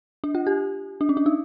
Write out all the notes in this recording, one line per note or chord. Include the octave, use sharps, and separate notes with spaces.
D4
F4
G4
D4
C#4
D4
D#4